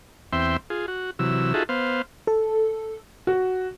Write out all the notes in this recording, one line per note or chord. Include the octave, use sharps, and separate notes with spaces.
E2 C4 E5 G5 C6
F4 G#4
F#4
C3 E3 F#3 E6
D#4 F4 F#4 G#4 A4 E5
B3 C5 F5
A4
F#4